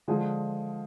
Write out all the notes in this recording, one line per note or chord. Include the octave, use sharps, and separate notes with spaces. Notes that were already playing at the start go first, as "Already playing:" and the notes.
D3 F3 G#3 G#4